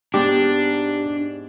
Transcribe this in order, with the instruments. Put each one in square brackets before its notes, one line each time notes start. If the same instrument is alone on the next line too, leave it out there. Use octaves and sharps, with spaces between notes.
[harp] G#2 B3 [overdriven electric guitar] D4 [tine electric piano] G4